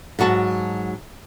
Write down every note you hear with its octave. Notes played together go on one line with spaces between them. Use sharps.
G#2 F#3 F#4 A5